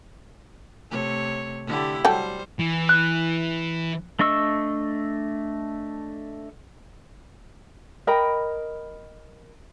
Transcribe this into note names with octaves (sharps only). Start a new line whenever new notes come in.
C3 A3 C#5
D3 E4 G4
F#3 G3 A4 C5 G5
E3
F#6
A3 D4 D#5 C#6 E6
A#4 D#5 G5 B5